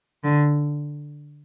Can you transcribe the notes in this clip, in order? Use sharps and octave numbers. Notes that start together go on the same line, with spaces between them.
D3